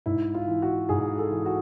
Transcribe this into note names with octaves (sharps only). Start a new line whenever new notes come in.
G#2 E4
F4
E3
F#4
G#2 G#4
A4
E3
F#4